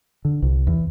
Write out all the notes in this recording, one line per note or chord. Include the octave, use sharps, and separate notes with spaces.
D3
C2
E2